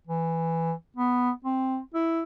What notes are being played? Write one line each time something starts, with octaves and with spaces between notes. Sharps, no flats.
E3
B3
C4
E4